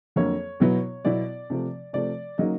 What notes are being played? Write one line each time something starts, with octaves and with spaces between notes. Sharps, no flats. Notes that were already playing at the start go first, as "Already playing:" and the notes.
F2 D3 F#3 A#3 C#5
B2 F#3 B3 E4
B2 F#3 B3 E4 D5
C3 F3 A3
C3 F3 A3 D5
C#3 F#3 A#3 D#4 D#5